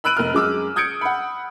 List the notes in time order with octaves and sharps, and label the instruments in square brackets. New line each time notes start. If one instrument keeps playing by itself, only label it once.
[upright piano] B5 E6 F#6 D7 D#7 F#7
F1 A#4 F6
F#2 G#3 D6 E6
D#6 G6 G#6 C#7 D7
F#5 B5